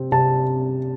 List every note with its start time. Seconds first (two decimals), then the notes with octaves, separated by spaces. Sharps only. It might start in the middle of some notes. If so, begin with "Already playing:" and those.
Already playing: C3 C4
0.12 C3 A5